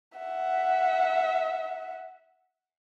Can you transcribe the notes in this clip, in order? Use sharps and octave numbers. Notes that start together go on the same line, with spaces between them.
E5 F#5